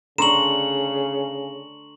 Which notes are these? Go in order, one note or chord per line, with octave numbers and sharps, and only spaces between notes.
C#3 D4 A4 A#5 C6 C#6 E7 F#7